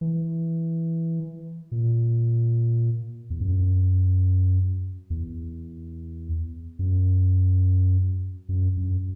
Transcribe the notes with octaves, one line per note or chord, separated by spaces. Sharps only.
E3
A#2
E2
F#2
E2
F#2
F#2
F#2